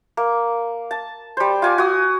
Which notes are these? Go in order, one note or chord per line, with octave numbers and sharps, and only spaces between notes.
A#3
A5
G3 C5
F4 G#5 D6
F#4 D#6